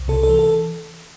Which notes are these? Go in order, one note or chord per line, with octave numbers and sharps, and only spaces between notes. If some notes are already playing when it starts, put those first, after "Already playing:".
Already playing: C2
C3 A4
A4
E3
A4